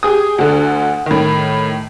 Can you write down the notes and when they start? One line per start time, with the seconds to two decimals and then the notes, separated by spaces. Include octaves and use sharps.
0.03 G4 G#4 D#6
0.38 D2 D3
1.06 A2 D#3